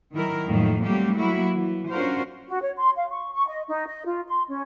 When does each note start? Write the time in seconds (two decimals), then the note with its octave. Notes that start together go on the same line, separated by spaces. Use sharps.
0.13 D#3 F#3 E4 A#4
0.46 F2 A2 D#3 F#3 A3 A#3
0.82 F#3 G3 A3 A#3 C4 G4
1.14 F#3 A#3 E4 F#4
1.55 E3
1.89 C#4 D4 F4 F#4 A#4 C5
2.49 F#4
2.62 C#5
2.77 C6
2.96 F5
3.10 C#6
3.34 C#6
3.48 D#5
3.68 D#4
3.87 D#5
4.05 F4
4.28 C6
4.48 C#4